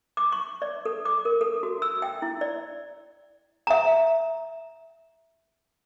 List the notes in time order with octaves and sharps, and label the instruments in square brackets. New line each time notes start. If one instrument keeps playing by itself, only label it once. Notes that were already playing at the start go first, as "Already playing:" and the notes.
[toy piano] D6
C#6
D5
A4
D6
A#4
A4
F#4
E6
G5
E4
D5
E5 A#5